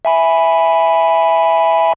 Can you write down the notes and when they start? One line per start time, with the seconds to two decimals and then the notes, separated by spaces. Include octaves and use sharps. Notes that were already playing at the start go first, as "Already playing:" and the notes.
0.05 E5 G#5 B5